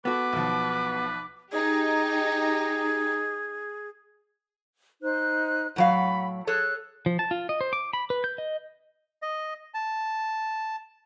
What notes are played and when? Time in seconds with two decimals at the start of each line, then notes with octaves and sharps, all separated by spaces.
0.05 B3 F#4 A4 B4 D6
0.33 B1 B2 F3
1.52 D#4 G4 G#4
5.03 D#4 C5 F#6
5.76 A2 F#3 F5 F#5 B5
6.47 G#4 A4 C#5 F#6
7.06 F3
7.19 A5
7.31 F4
7.49 D#5
7.61 C5
7.73 D6
7.93 B5
8.10 B4
8.24 G6
8.38 D#5
9.22 D#5
9.74 A5